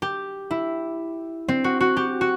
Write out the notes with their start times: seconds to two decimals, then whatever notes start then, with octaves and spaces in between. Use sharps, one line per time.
0.02 G4
0.51 E4
1.48 C4
1.64 F#4
1.80 F#4
1.97 G4
2.21 F#4